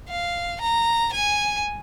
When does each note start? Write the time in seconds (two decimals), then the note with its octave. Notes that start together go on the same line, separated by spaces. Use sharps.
0.10 F5
0.61 A#5
1.13 G#5